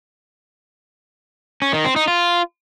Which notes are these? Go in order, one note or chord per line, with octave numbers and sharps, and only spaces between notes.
C#4
D#3
C4
D#4
F4